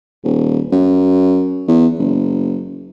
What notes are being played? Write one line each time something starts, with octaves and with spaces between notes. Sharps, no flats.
D#1
F#2
E2
F#1